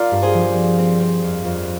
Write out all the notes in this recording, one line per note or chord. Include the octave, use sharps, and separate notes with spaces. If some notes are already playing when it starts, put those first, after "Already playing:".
Already playing: F4 A#4 D5
G2
G#4 C5
F3
C4
C4
C4
F2
F2